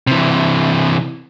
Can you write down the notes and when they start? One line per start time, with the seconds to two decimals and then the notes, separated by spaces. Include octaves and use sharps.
0.07 C3 E3